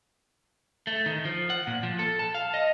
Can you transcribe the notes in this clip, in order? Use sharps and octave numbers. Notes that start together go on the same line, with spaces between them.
A3
D#3
F3
F#5
A#2
F3
A4
A5
F5
D#5